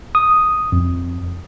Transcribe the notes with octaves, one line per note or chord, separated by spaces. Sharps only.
D#6
F2